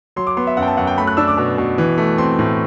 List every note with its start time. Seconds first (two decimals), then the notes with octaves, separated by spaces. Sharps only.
0.16 F#3 C6
0.27 D6
0.37 B3 C6
0.47 E5
0.57 F#2 F#5
0.63 G5
0.67 A5
0.77 F#2 F#5
0.87 G5
0.98 A3 B5
1.07 F#6
1.17 D4 E6
1.28 D6
1.37 B2
1.58 B2
1.78 E3
1.98 A3
2.18 C4 C6
2.39 A2